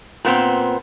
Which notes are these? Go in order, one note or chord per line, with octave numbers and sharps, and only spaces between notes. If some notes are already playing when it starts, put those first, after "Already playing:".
A#2 B3 C4